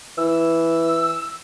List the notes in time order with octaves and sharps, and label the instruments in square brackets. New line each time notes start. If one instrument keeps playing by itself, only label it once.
[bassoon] E3 [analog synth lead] E6